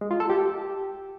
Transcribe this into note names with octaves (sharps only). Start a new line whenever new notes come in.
G#3
F4
A4
G4